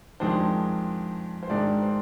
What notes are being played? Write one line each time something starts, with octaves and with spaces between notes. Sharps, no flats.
F2 D#3 G#3 D4 C5
C5
G#2 D#3 G#3 D4 D5
C5